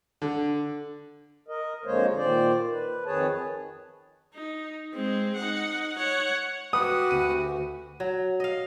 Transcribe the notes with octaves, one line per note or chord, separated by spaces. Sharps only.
D3
A#4 D#5
F2 D3 G#3 A#3 C5 C#5
A#2 D#3 C5 D5
B4
F2 D#3 G#4 B4 C#5 A5
D#4
G#3 C4
D#4 F#5
C#5 F#5
F#4 G4 B4 F#5 D#6
D2 D#7
F#3
D#5 F5